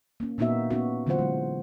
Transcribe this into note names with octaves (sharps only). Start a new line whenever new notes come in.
A#3 C#4
A#2 A#3 B3 D#4 F#4 E5
B3 C#4 D#4 F#4
D3 E3 F#3 F4 C5 F#5
G#3 D#4